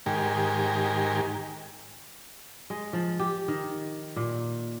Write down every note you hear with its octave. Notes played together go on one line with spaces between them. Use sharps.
G#2 D#3 G4 A#4 G#5
G#3
F3
G4
D#3
A#2